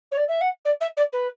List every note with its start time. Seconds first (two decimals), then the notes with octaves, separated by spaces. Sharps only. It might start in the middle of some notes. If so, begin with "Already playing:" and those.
0.11 C#5
0.17 D5
0.28 E5
0.40 F#5
0.65 D5
0.80 E5
0.96 D5
1.12 B4